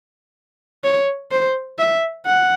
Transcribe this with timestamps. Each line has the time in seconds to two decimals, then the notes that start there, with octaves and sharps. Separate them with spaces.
0.84 C#5
1.31 C5
1.79 E5
2.26 F#5